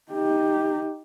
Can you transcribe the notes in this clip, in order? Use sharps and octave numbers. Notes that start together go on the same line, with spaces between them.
D#4 G4